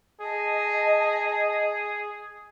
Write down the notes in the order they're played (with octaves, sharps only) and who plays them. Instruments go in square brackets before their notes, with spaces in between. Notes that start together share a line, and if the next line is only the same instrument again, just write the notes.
[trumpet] G#4 [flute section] D#5 A5